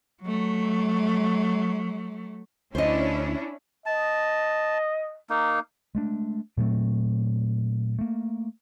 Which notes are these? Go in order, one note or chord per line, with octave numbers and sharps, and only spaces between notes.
F#3 A3
D2 C#4 D4 E4 C5 D#5
D#5 A5
A#3 D#4
G#3 A3 D4
A#2 F#3 A3 C4
A3 A#3